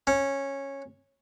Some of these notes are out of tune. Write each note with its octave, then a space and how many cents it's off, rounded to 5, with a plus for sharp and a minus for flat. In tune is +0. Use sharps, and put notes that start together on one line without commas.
C#4 -10